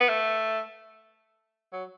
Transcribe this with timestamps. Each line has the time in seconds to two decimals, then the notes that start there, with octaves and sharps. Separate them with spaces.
0.01 B3
0.09 A3
1.73 F#3